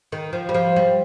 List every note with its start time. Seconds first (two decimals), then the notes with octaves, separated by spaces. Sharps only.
0.12 D#3
0.33 F3
0.49 G3
0.54 F3
0.76 G3